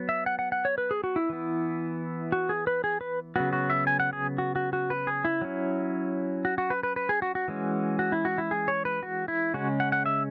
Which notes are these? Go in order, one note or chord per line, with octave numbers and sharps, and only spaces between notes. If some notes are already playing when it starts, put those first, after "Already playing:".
Already playing: F#3 B3
E5
F#5
F#5
F#5
C#5
B4
G#4
F#4
E4
E3 B3
F#4
G#4
B4
G#4
B4
C#3 F#3 B3 F#4
F#4
E5
G#5
F#5
G#4
F#4
F#4
F#4
B4
G#4
E4
F#3 C#4
F#4
F#4
B4
B4
B4
G#4
F#4
F#4
E3 G#3 C#4
F#4
E4
F#4
E4
G#4
C#5
B4
F#4
E4
C#3 G#3 C#4 F#4
F#5
F#5
E5